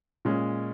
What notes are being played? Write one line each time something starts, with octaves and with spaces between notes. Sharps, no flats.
A#2 G#3 C#4